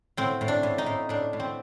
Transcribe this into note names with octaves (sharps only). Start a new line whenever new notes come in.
A2 C4
A2
D4
A2
D#4
A2
A2 D4
A2
C4